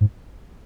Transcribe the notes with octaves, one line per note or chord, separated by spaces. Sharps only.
G#2